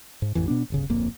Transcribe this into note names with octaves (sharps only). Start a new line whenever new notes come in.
G#2
A1 F2 E3
B2 B3 D4
D1 G1 C#3
D1 A#1 F2 A#3